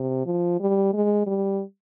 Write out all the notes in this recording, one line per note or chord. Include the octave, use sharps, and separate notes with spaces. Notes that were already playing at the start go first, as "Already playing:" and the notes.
Already playing: C3
F3
G3
G#3
G3